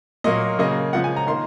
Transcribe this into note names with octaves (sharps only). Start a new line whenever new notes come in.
A#2 F#3 A#3 D#5
C#3 F#3 A#3 D#5
C#3 F3 G#3 F#5
G#5
A#5
D#3 A#3 C6